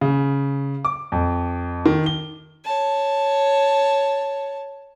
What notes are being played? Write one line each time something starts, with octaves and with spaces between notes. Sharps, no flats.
C#3
D6
F2
D#3
G7
C#5 A5